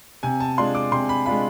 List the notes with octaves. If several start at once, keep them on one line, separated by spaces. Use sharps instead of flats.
C3 G#5
A5
G#3 D4 F4 C6
D6
C3 C6
B5
G#3 D4 F4 B5